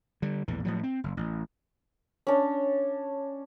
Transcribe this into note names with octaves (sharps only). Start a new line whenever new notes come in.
D3 G3
A#1 E2 A2 E3
A2 F3 F#3
C4
F#1
A1
C#4 D4